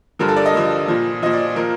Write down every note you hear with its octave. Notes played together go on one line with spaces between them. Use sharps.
G2 D3 F3 A#4
A4
D5
D#5
G2 D3 F3
A#2 F3
A#2 F3 D#5
D5
A#2 F3 A#4